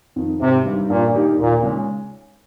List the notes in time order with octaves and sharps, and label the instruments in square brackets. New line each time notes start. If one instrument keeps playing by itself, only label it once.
[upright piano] F2 D#3
[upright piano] G#1 [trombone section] C3
[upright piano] G2 D#3 G3
[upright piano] G2 [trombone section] A#2
[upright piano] D#3 A#3 D#4 G4
[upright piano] D#2 [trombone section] A#2
[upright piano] C#3 G#3 C#4